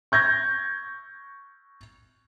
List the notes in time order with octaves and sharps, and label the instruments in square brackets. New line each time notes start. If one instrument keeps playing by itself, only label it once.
[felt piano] C#6 G6 G#6 A#6